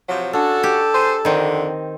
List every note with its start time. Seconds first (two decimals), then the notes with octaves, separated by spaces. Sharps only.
0.09 C3 F3 F#3
0.33 C#4 D4 F#4 A4
0.63 G4
0.94 G#4 C5
1.25 F2 D3 D#3 C4